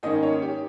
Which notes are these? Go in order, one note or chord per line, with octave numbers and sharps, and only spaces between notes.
G#2 D#3 A#3 C#4 D#5
C#5
G4